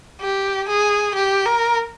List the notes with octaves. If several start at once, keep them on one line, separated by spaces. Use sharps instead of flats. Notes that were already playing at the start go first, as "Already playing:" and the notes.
G4
G#4
G4
A#4